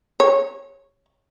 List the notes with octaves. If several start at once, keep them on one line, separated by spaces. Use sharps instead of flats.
C#5